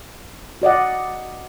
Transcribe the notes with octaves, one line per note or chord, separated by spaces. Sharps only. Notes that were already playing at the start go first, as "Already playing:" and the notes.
F#4 D5 D#5 F#5